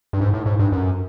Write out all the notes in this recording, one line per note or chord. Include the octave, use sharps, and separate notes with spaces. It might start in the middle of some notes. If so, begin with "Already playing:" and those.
G2
G#2
A2
G#2
G2
F#2